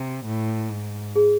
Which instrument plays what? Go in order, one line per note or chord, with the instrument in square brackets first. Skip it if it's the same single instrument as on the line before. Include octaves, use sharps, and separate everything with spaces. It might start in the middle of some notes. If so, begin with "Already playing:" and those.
Already playing: [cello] C3
A2
G#2
[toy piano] G#4